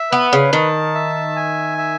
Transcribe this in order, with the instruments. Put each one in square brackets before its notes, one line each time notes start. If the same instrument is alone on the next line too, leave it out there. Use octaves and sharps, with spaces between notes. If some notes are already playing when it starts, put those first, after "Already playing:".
Already playing: [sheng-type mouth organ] E5
[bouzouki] B3 [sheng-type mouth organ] B4
[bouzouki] C#3
[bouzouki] D#3 [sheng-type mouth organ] A5
[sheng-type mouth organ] E5
G#5
E5